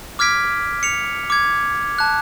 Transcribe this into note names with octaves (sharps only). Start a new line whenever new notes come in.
D6 F6 G#6 B6 D7
C#7 F7
D6 G#6
A5 F#6